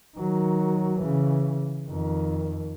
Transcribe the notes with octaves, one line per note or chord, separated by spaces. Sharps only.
D#3 F#3
C#3 E3
F2 D#3